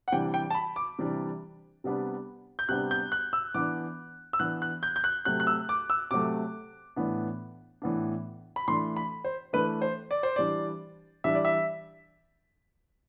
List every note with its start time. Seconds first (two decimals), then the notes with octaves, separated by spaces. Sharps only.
0.08 F#5
0.12 C3 E3 G3 D4 G5
0.34 G5
0.50 A5
0.55 B5
0.76 D6
0.99 C3 E3 G3 D4
1.84 C3 G3 B3 D4
2.59 G6
2.69 C3 G3 B3 D4 F#6
2.91 G6
3.12 F#6
3.33 E6
3.54 E3 B3 D4 D6
4.33 E6
4.40 E3 B3 D4 F#6
4.62 F#6
4.83 G6
4.96 G6
5.04 F#6
5.25 C3 F#3 A3 F#6
5.40 F#6
5.47 E6
5.69 D6
5.90 E6
6.11 C3 F#3 A3 D6
6.96 A2 E3 B3 D4
7.82 A2 E3 B3 D4
8.56 B5
8.68 E3 A3 D4 C6
8.96 B5
9.25 C5
9.53 E3 A3 D4 B4
9.82 C5
10.11 D5
10.23 C5
10.36 E3 G3 D4 D5
11.24 E3 G3 D4 E5
11.35 D5
11.45 E5